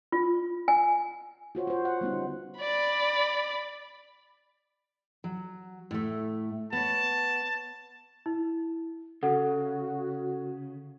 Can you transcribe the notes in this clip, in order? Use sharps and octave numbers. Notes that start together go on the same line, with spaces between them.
F4
G#5
F4 F#4 C5 C#5
F#4 C5
F#5
G3 B3 C#4 D#4
D3
D5 B5
F#3
A2 A3
B3 C#5 A5
E4
C#3 F#4 A4 F#5